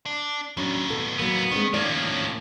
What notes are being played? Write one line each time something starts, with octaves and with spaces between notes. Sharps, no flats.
D4
D#2 A2 F#3 C#4 D4
B2 B3 A4
F#3 A#3 B3
D#3 G#3 C4 D4
A2 D#3 F3 A#3 C#4 C#5 D5